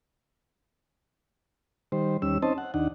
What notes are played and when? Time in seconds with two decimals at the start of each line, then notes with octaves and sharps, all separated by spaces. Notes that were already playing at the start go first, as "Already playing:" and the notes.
1.92 D#3 G3 C5
2.22 D#2 G3 C#4 E6
2.42 C4 C#4 D#4 C5 D#5 A5
2.58 F#5
2.74 D#2 D4 D#4 F#5